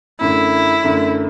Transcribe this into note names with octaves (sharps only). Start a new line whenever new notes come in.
F#2 D3 A3 E4
F#2 D3 A3